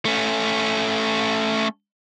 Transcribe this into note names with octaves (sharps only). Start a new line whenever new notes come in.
A3 C#4